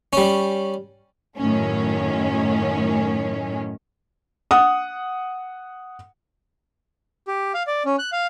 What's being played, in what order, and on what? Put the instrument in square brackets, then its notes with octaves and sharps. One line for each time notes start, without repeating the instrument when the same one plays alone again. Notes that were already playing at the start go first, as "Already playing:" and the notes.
[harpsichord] G3 C#4
[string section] F#2 A2 D#3 C#4
[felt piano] F#5 D#6
[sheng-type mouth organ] G4
F5
D5
C#4
F#6
F5